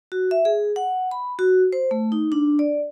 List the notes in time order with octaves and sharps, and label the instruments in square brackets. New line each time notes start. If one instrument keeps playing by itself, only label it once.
[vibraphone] F#4
E5
G#4
F#5
B5
F#4
C5
A3
D#4
D4
D5